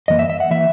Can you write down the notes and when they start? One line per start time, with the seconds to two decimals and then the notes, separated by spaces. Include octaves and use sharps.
0.08 F#2 E3 A#3 D#5
0.19 E5
0.30 E5
0.40 F#5
0.51 E3 A#3 E5